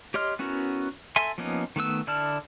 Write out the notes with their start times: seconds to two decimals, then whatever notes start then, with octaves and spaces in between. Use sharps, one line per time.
0.14 G4 C#5 D#5 C6 F6
0.39 B3 C#4 E4 F#4 A#4
1.16 A4 E5 G#5 C6
1.38 F3 A#3 B3 C#4 D#4
1.76 D#3 A3 B3 E6
2.07 D3 E4 D5 A5 F6